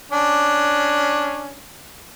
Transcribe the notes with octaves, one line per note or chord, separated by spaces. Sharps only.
C#4 D4